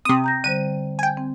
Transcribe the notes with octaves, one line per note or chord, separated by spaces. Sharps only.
C3 C4 G5 D#6
A#5 G6 A#6
D3 G3 C5 D#7
G5 G#5
C4